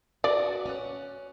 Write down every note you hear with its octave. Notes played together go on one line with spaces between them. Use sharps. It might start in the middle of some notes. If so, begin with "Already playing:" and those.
F#4 B4 D5
C#4 F#5